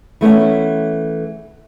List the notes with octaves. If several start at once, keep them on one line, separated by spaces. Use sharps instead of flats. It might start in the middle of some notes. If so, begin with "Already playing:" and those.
E3 A3 B3 C#4